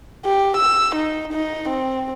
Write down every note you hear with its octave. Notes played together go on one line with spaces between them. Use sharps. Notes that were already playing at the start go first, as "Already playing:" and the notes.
G4
E6
D#4
D#4
C4